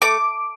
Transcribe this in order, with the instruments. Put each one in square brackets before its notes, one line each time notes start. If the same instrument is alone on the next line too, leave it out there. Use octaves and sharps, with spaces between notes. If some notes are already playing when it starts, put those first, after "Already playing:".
[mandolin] A3 D6